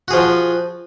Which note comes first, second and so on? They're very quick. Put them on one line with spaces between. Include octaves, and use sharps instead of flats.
F#4 G#4 F3